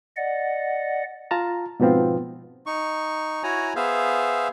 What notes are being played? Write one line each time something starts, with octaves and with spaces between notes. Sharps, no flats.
D5 D#5 F#5
F4 A5 A#5
G#2 B2 F3 B3 C4 F4
D#4 C#6
E4 F#4 C#5 G#5 A#5
B3 G#4 C5 E5 F5